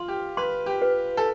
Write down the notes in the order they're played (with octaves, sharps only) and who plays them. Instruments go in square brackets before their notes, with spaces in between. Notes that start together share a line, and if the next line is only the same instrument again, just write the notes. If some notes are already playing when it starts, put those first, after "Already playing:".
Already playing: [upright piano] F4 [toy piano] C6
[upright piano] G4
[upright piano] B4 [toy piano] C6
[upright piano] G4
[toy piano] B4
[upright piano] A4